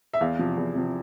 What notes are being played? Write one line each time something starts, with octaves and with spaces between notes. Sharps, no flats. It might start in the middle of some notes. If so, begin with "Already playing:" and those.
E5
E2 F5
C3 F3
E2
C3 F3